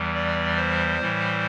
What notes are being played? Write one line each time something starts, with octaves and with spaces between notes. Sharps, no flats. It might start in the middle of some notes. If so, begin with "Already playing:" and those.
Already playing: E2 E3 G3
D5
C5
A2 E3 G3